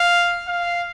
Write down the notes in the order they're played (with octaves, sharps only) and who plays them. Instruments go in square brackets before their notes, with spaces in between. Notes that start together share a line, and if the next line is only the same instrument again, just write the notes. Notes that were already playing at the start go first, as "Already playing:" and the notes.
Already playing: [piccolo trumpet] F5
F5